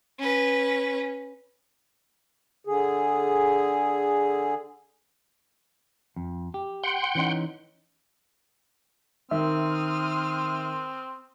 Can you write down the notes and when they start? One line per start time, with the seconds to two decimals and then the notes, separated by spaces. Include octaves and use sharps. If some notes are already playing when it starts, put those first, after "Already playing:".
0.19 C#4 B4
2.67 D3 G#4
6.16 F2
6.54 G4
6.83 F#5 G5 C6
7.15 E3 C#4 D#4
9.31 D#3 C4 E5 C6 D#6 F6